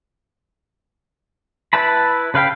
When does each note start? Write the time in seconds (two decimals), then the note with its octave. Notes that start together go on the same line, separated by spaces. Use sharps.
1.73 E4 B4 E5 A5 B5
2.34 C#3 B4 F5 G5 B5